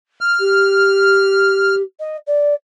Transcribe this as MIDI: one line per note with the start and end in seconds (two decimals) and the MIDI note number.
0.21 1.75 89
0.39 1.82 67
2.00 2.17 75
2.27 2.54 74